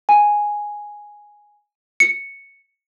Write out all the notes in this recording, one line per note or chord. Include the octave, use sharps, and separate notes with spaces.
G#5
C#7